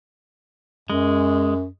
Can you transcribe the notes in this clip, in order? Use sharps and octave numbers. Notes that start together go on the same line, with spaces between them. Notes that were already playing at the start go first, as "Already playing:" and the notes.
F#2 G#3